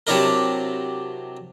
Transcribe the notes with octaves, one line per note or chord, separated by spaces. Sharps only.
C3 F#3 D4 E4 A#4